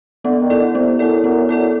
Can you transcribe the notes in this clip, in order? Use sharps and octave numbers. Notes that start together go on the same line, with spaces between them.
D3 B3
D#3
E4 A4 D5
D3
C3 B3
F#2 E4 A4 D5
F#2 B3
F#2 E4 A4 D5